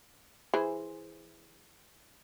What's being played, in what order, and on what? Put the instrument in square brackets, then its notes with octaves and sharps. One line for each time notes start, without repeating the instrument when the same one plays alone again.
[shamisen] E3 G#4 C5